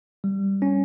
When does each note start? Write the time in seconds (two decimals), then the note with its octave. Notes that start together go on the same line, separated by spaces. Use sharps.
0.24 G3
0.62 C#4